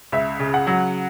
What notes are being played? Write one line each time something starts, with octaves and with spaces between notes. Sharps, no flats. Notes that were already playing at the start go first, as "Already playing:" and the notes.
C#2 E5
C#3
F#5
F#3